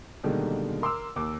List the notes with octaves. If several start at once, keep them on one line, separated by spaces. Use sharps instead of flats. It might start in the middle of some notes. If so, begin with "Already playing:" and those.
B2 D3 D#3 G3 G#3 A#3
A#4 C6 D6 E6
D#2 D6